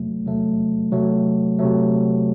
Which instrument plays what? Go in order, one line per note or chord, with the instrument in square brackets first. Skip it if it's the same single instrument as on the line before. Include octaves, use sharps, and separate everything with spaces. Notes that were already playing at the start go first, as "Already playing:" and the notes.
Already playing: [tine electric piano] C3 F#3 A3
C3 F#3 A3
C3 F#3 A3
C3 F#3 A3